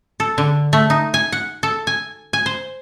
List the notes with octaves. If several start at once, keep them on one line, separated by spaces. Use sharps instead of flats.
A4
D3
A3
D#4
G#5
F#5
A4
G#5
G#5
C5